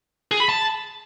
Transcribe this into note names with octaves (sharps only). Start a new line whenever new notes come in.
G#4
B5
A5